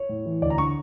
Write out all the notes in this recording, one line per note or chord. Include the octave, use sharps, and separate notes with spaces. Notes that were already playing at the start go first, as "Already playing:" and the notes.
Already playing: C#5
A2
E3
D2 D5
A#5
D3 C#6